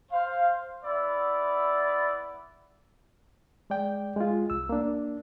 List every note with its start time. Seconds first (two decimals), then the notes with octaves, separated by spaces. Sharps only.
0.12 C5 F5
0.84 B3 E4 D5 E5 B5
3.70 G#3 D5 G5
4.16 G#3 F4
4.50 C2 E6
4.69 A#3 D4